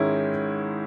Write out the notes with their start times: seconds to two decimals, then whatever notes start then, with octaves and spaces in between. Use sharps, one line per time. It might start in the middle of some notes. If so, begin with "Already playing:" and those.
Already playing: G#2 D#3 G#3 C#4 E4